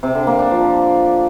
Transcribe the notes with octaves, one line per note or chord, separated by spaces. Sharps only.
C3
D3
A#3
D4
F3